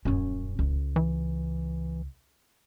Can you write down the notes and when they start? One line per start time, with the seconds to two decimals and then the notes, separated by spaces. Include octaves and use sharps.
0.05 D#1 F#2 C#4
0.59 C#2
0.96 E3